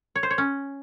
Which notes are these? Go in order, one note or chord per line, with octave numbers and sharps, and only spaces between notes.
C#5
C5
C#5
C#4